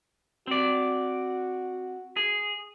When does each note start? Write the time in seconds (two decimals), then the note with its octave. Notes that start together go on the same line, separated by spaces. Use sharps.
0.47 C4 F#4 D5
2.17 G#4